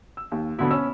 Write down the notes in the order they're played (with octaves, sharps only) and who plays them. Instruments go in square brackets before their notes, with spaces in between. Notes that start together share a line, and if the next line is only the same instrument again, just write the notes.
[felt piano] E6
D#2
[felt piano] B2 D3 F#3 [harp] B3 E4
[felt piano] C#4 E6